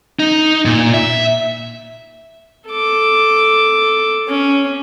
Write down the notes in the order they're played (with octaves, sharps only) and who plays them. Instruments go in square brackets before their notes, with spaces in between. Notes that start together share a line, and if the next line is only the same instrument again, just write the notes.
[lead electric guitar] D#4
A#2
E5
[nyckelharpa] A4 D6
C#4